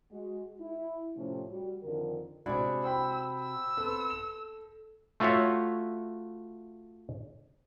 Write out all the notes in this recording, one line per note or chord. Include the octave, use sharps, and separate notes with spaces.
G#3 F#4
E4
A2 C3 F3 A3 C4 C#4
G3 F#4
F2 D3 D#3 A#4
C3 G#3 D4 E4 F#4
C5 G5 B5 E6
E6
B3 C4 A4
E7
A3 F4 F#4 C#5 E5